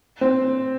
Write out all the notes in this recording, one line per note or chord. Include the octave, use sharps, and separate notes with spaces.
C4